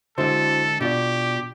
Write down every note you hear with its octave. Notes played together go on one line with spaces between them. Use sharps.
D3 G#3 E4 F#4 A4 C5
B2 D4 F4 G4 D5